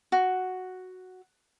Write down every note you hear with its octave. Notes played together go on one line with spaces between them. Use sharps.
F#4